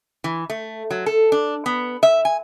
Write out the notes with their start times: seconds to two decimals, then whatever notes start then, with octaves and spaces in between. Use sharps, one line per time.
0.24 E3
0.50 A3
0.91 F#3
1.06 A4
1.32 D4
1.66 B3
2.03 E5
2.25 G#5